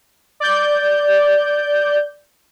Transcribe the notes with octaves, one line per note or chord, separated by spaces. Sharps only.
D5 G6